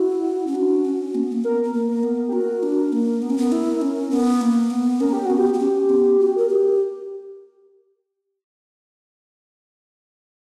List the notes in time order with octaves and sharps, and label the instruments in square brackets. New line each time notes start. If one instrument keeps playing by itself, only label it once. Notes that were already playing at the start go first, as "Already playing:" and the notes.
Already playing: [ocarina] E4 [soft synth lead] F#4
[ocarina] C#4
D4
C#4
A#3
B3
A#3
[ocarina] B3 [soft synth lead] A#4
[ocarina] B3
A#3
[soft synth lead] A#4
[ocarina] B3
[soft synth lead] G4
[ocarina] F#4 [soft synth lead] A#4
[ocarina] D4
A#3
B3
C#4
B3
E4
C#4
B3
A#3
B3
[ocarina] C#4 [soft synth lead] A#4
[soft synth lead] G4
[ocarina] B3 [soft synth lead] F#4
[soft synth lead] G4
[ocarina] B3
C#4
B3
F#4
A#4
G4